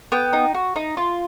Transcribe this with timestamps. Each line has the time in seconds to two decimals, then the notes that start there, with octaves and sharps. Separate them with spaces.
0.12 B3 G5
0.33 D#4
0.54 F#4
0.76 D#4
0.97 F4